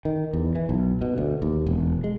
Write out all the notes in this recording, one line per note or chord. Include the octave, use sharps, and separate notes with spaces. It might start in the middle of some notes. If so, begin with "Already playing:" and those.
D#3
E2
E3
B1
B2
D2
D#2
E1
G#3